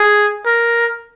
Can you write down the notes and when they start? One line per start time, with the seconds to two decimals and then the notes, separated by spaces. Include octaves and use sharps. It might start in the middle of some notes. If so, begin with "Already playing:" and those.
Already playing: G#4
0.46 A#4